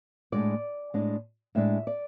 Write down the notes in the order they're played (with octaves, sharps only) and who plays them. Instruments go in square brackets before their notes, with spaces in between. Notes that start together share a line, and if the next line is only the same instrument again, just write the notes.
[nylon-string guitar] A2 G#3 D4 D5
A2 G#3 D4
A2 G#3 D4 E5
D5